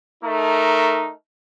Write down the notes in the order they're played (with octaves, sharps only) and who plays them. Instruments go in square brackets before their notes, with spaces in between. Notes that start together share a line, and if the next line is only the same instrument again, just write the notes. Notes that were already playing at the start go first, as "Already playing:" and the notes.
[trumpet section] A3 D#4 A#4